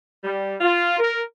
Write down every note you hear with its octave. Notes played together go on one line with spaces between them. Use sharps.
G3
F4
A#4